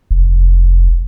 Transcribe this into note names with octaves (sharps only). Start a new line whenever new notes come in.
F1